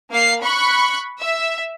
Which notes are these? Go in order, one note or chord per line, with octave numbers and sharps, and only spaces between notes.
A#3 F5 C7
B5 C#6 F#6
E5